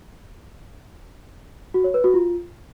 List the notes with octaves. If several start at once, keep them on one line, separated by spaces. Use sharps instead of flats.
F#4
C#5
B4
F#4
F4